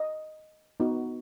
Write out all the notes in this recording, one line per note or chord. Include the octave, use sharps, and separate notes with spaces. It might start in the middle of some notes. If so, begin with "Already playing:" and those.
Already playing: D#5
B3 D#4 F#4